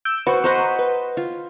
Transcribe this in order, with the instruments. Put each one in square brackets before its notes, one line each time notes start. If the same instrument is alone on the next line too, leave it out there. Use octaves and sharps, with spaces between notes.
[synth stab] E6 G6 D7
[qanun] F#4 [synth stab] B4 C5 C#6
[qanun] C5 D#5 B5 [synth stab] F#5 A#5 C#6
[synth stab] B4
[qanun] F4